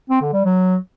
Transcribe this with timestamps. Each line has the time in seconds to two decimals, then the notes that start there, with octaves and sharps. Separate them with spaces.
0.10 C4
0.22 D3
0.33 G3
0.45 F#3